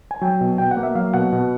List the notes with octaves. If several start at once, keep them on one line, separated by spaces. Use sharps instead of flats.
G#5
F#3 G5
B2
B2 G5
F#5
A#3
E5
F#3 F5
B2 F#5
B2